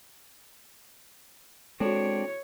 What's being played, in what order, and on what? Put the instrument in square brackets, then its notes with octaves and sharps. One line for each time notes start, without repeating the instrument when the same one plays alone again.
[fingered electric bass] G#3 [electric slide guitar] C4 D4 [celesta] F#4 A4 [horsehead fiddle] C#5